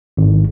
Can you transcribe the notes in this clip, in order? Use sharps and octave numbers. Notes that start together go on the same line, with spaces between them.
G#1